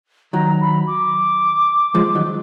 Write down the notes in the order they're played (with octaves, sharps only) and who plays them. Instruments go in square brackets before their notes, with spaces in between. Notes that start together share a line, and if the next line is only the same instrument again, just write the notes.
[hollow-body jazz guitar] D#3 F#3 [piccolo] A#5
[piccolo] B5
D6
[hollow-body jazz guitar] F3 G#3
D#3 F#3